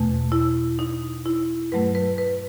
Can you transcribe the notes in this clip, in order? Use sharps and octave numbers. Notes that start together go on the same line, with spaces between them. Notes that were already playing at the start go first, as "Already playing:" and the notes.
Already playing: E2 B2 A3
E4
D#4
E4
G2 F#3 A3 B4
B4
B4